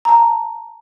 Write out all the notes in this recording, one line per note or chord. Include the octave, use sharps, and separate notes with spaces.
A5 A#5